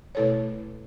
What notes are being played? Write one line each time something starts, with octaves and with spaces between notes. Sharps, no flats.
B2 A3 E4 A4 C#5